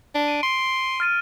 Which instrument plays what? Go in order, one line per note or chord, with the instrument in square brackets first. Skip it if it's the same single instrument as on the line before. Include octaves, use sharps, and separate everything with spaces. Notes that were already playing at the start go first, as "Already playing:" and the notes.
[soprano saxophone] D4
[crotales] D7 D#7
[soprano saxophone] C6
[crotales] F6 A6 D#7